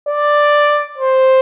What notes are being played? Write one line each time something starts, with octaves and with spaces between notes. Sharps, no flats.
D5
C5